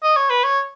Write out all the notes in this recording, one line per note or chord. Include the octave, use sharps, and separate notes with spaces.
D#5
C#5
B4
C#5